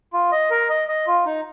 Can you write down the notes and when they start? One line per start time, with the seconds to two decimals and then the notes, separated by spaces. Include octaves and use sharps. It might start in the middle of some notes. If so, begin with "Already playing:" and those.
0.13 F4
0.32 D#5
0.51 A#4
0.70 D#5
0.88 D#5
1.07 F4
1.26 D#4